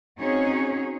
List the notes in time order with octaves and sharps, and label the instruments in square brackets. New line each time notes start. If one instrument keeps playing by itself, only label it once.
[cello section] C4 C#4 D#4 F#4 G#4 C#5